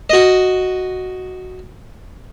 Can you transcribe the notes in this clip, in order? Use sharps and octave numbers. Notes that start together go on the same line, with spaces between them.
F#4 D#5